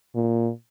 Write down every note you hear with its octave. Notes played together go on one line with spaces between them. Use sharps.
A#2